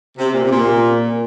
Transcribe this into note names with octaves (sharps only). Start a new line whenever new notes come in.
C3
A#2
C3
A#2